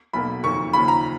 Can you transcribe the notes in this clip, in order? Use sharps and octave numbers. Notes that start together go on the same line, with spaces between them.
B1 B2 A#3 B5
F#1 F2 D#3 F#3 A#3 C#6
D#2 C#3 F3 B5
A#5